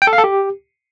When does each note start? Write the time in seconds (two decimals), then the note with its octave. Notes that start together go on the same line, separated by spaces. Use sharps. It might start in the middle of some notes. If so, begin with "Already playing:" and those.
0.02 G5
0.07 A4
0.13 F5
0.18 A4
0.24 G4